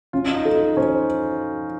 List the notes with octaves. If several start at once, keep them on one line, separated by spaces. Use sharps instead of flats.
C#4 F4
D#4
A4
D#4
C#4 C5